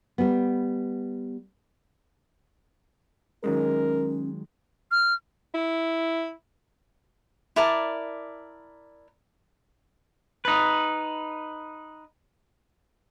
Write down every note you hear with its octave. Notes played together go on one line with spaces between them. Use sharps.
G3 B3
D#3 F#3 G#3 C#4 A#4
F6
E4
E4 A#4 D5 A5
D#4 B4